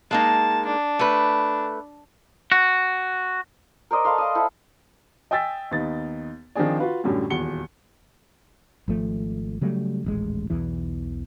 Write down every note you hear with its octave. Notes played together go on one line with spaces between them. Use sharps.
G#3 A#3 D#4 A5
D4
A3 B4
F#4
A#4 C5 D5 D#5
A4 B4 F5 C6
D#5 F5 A5
E4 A4 C5
D#5 G5 G#5 E6 A6 B6
D#2 B3 D#4 A6
D#3 F3 C4 D4 G#4 D5
F4 F#4 B4 F5
F#2 A2 D3 F#3 G3 C#4
D#1 E2 F#4 C#7 G7
G#1 F3 A3
C#3 F#3 G3 A3
D#1 A1 G#3
B1 E2 E3